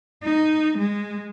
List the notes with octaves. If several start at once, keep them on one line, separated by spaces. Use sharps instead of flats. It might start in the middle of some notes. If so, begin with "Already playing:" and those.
D#4
G#3